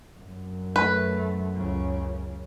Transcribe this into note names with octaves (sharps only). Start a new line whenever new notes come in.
F#2
A3 B4
C#2 C#3